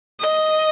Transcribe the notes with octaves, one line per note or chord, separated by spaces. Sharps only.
D#5